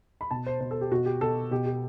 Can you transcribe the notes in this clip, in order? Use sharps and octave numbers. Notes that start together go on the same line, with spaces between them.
B5
B2 A5
C5
B2 C5
A4
G4
B2 F#4
G4
B2 A4
B2 G4
G4